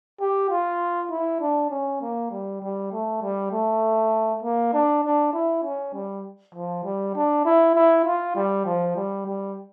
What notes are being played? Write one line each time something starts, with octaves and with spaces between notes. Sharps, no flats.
G4
F4
E4
D4
C#4
A#3
G3
G3
A3
G3
A3
A#3
D4
D4
E4
C#4
G3
F3
G3
D4
E4
E4
F4
G3
F3
G3
G3